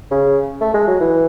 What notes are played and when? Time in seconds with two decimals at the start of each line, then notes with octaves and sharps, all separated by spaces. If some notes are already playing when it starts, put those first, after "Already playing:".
0.11 C#3
0.61 A3
0.74 G#3
0.88 F#3
1.00 E3